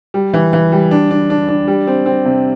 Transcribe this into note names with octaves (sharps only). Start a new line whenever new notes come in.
G3
E3
E3
G3
D4
D4
D4
D4
G3
C4
C4
C3